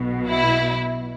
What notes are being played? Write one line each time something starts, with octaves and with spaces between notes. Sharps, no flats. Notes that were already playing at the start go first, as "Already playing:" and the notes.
Already playing: B1 B2
E4